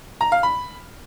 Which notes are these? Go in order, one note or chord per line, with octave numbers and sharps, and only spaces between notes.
A#5
F5
B5